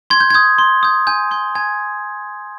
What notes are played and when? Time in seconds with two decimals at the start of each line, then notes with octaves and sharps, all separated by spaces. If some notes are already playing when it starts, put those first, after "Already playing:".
0.10 C6 G#6
0.20 G6
0.30 D#6 G6 G#6
0.58 C6
0.83 D#6 G6
1.07 G#5 G6
1.31 C6 G6
1.55 G#5 G#6